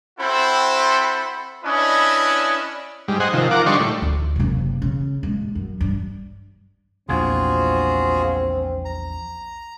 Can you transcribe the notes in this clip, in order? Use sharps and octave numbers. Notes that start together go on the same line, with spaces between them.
C4 E4 F#4 A4 C5 B5
C#4 D4 E4 B4 D#5
G#2 G3
C5 D#5 F#5 G#5
C3 D#3 F3
F3 A#4 F#5 D6
D3 G3 D#4 D5 C6 C#6
A2
D2
F#1 C3
C#3
A#1 G#3
F#2
G2
A#1 E2 C4 F4 F#4 G#4
A#5